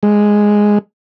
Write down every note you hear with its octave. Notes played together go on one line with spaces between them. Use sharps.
G#3